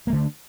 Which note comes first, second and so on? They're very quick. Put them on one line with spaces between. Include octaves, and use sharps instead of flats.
A#3 A3 D3 D4